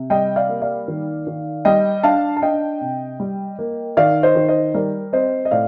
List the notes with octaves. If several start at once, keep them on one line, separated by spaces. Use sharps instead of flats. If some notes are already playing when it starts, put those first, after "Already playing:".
Already playing: C3
G3 D#5 G5
D5 F5
A#3
D5 F5
D#3
D#3
G3 D#5 G5
D4 F5 A5
A5
D4 D#5 G5
C3
G3
A#3
D#3 D5 F5
C5 D#5
D#3
C5 D#5
G3 A#4 D5
C4 C5 D#5
D#5
A2 D5 F5